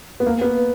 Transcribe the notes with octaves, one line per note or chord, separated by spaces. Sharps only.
B3
A#3
B3